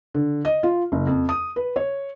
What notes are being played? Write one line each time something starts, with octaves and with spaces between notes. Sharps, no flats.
D3
D#5
F4
F#1
F2
D#6
B4
C#5